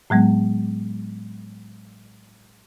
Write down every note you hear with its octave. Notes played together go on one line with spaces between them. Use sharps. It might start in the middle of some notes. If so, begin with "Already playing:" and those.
A2 F#3 G#3 B3